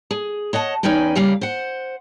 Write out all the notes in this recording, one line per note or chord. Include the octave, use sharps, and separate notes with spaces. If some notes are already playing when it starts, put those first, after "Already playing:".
G#4
C#5 D#5 F#5 A5
E2 C#4 D#4 B4 G5 G#5
C#3 G3 A#3 F5
C5 F#5